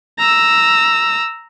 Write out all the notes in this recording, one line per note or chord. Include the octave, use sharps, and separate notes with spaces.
A#5 E6